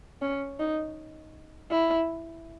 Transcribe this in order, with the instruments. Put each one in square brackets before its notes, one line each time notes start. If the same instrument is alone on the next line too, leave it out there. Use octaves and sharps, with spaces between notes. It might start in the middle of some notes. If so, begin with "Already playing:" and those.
[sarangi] C#4
D#4
E4